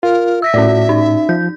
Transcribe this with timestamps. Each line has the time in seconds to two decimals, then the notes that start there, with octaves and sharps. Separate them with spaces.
0.03 F4 A#4
0.42 E5 E6 A#6 B6
0.54 A2 C#4 F#4 D5
0.89 D#4
1.29 F3 G6